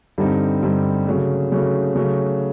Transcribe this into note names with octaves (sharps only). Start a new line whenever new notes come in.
G2 D3 G3 C4 D#4
G2 D3 G3 C4 D#4
C#3 F#3 A3
C#3 F#3 A3
C#3 F#3 A3